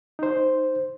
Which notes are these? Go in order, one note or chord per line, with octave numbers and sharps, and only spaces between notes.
D#4 C5